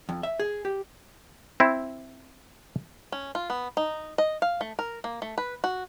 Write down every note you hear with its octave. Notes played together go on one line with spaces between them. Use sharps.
F2
E5
G#4
G4
C4 E4
C#4
F4
B3
D#4
D#5
F5
A3
A#4
A#3
A3
B4
F#4